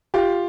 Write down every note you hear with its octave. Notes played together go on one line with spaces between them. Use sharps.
F4 G4